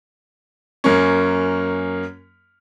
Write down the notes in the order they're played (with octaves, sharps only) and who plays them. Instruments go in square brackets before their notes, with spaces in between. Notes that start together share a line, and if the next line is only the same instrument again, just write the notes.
[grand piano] F#2 A#3 C#4